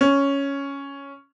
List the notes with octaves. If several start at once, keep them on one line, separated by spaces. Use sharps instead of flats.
C#4